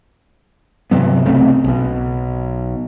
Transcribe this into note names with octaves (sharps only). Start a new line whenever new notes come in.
G2 C3 F#3 B3
C2 C#3 A3 C4
B1 B2